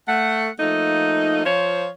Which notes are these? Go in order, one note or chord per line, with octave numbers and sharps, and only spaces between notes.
A3 F#5
F3 A3 A#3 D#4
F3 F4 C5 C#5